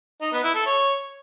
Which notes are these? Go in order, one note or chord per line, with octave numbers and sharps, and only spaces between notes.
D#4
B3
E4
A4
C#5